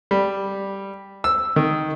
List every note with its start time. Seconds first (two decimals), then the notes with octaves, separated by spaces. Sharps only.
0.11 G3
1.24 E6
1.56 D#3